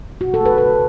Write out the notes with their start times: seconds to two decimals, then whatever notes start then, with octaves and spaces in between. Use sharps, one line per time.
0.21 B2 F#4
0.34 A4
0.40 A3
0.46 B4
0.58 C#3 B4